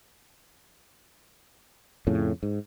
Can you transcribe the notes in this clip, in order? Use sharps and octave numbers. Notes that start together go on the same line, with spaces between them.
F2 A2 C#3
G#2